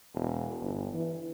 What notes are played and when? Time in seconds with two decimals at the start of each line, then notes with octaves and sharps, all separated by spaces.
0.14 E1
0.61 G1
0.93 E3